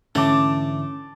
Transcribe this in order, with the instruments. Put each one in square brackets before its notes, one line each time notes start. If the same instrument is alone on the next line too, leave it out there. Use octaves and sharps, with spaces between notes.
[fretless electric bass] G#2 D3 E3 [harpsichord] A3 [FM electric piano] C#4 [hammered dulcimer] A5 D6